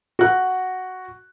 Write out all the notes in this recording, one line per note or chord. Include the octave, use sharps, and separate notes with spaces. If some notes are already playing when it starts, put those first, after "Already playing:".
F#4 F#6